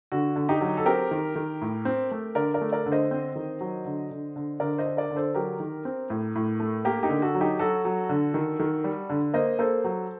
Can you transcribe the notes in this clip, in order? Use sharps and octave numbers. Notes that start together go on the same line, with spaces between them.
D3 F#4
D3
D#4 G4
F#3
A4
C4 G4 A#4
D#3
D#3
A2
C4
A3
D3 A#4 D5
A#4 D5
A3
A#4 D5
D3
C5 D#5
C4
D#3
F#3
D3
D3
D3
D3 A#4 D5
C5 D#5
D4
A#4 D5
D3
A4 C5
F#3 G4 A#4
D#3
C4
A2
A2
A3
A#3 G4 A#4
D#4 G4
D3
F#4 A4
F#3
D#4 G4
F#3 F#4 A4
F#3
D3
D#3
D#3
G3
D3
A#3 C5 D#5
A#3 A4 C5
F#3